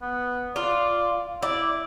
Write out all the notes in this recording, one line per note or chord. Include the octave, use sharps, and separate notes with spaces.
B3
F4 D5
E4 D5